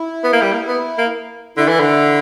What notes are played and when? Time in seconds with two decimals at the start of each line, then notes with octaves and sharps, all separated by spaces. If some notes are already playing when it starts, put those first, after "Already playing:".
Already playing: E4
0.24 B3
0.33 A#3
0.42 G3
0.52 A#3
0.68 B3
0.98 A#3
1.57 D3 E4
1.68 E3
1.80 D3